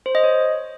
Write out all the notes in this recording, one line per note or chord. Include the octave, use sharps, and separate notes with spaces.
C5
D#5
C#5